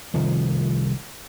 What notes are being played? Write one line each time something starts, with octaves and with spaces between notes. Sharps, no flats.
C2 D#3 F3